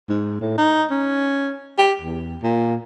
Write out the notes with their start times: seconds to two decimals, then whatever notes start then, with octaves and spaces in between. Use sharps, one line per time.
0.10 G#2
0.41 A2
0.58 D#4
0.91 C#4
1.78 G4
2.01 E2
2.42 A#2